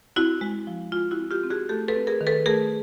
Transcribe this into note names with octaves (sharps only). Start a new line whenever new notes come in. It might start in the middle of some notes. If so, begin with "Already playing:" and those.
C4 E4 F#4
G#3
F3
G#3 F4
E4 F#4
C4
F4 G4
C4
F#4 G#4
A3 G4 A4
A4 B4
C4
G#4 A#4
D#3
A4 B4
A3 G#4 A#4